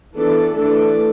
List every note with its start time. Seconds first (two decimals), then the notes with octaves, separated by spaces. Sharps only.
0.13 E3 B3 D4 A4
0.53 E3 A3 D4 A4